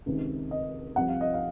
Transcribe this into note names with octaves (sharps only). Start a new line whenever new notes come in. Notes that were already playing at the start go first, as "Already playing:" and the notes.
C#2 C3 D#3
D#5
C2 C3 F3 F#5
F5
D#5
F5